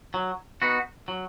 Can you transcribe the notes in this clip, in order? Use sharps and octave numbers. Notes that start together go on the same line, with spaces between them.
F#3
B3 D#4 F#4
F#3